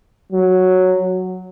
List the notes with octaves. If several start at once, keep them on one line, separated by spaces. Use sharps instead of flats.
F#3